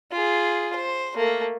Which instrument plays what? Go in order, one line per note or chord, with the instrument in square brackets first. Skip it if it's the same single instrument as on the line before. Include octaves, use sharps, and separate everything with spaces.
[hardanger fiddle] F4 G#4
C5
A3 A#3